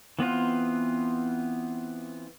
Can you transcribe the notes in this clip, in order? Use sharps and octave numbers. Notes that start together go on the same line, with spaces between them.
E3 B3 C4 F4